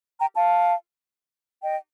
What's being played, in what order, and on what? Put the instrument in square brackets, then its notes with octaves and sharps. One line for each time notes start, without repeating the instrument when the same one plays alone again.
[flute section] G5 A#5
F5 A5
D#5 G5